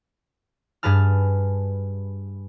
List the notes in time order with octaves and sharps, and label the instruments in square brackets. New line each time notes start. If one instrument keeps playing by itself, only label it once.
[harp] G2 G#4 B4 A5 F6